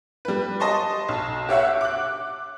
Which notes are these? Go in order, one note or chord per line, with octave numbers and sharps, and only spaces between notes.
G3 B4
D#5 A5 C6 C#6
B1
G4 C#5 E5 F#5
D6 F#6